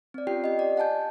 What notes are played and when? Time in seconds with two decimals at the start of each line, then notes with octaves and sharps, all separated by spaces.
0.14 C4 D5
0.27 C#4 F4 G4 G5 C7
0.44 G4 D#5
0.59 D5
0.77 F#5 G#5 A5 G6